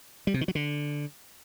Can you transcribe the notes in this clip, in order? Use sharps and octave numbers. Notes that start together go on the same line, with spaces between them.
G3
C3
D#3
F#3
D3